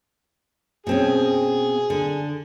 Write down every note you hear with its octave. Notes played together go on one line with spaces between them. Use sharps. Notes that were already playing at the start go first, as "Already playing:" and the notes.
B2 C4 C#4 G#4
D3